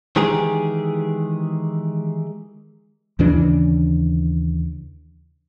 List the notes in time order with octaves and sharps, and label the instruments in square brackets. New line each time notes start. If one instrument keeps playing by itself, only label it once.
[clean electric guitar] D#3 E3 G#3 G4 G#4 A#4
[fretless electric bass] D#2 C#3 E3 D4